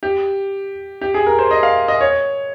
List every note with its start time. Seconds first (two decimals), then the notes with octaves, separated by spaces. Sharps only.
0.03 G4
1.01 G4
1.14 G#4
1.26 A#4
1.39 C5
1.51 D#5
1.63 F5
1.88 D#5
2.01 C#5